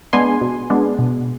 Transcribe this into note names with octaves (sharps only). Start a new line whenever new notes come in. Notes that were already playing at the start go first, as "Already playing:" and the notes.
G#3 B3 D4 G#5 C6
B2
G#3 B3 D4
B2